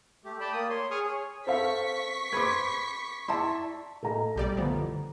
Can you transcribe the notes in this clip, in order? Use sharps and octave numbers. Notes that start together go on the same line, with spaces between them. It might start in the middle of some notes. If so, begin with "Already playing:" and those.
A3 G4
D5 G5 A5 B5
A#3 D#6
C#5 C6
G#4 C#6 D#6 F6
G#4 C#5
C4 A4 F5 C#6 B6
B4 C5 D6 G#6
E4 D5 A5 C6
A2 A3 A4 D#5 A5 A#5
B1 G3 A3 D5
F#2 D3 E3 F3 B3